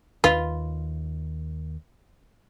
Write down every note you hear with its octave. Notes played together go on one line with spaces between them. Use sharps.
D#2 F4 B4